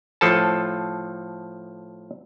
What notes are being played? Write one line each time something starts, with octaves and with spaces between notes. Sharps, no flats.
A2 F3 A4 A5